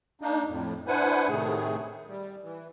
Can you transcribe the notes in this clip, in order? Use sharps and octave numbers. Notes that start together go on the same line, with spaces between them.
A#3 D4 D#4
F2 A2
D4 E4 B4 C5 F#5 G#5
A2 C3 D#3 A3 G#4
G3
E3